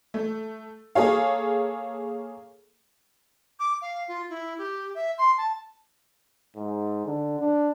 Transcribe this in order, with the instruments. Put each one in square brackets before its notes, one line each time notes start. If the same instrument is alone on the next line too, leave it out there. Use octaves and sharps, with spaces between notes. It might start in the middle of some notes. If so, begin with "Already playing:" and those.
[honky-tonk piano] A3
A#3 G#4 A4 C#5 F5
[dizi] D6
F5
F4
E4
G4
E5
C6
A5
[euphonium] G#2
D3
D4